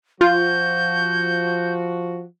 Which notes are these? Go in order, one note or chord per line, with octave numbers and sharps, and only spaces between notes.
F3 F4 F#4 G6